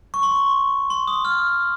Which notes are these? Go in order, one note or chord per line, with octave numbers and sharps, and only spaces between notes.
C#6
C6
C6
D#6
F6